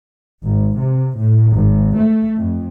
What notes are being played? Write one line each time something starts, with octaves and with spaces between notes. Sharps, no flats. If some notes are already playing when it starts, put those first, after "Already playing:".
G#1
C3
A2
G#1
A3
F2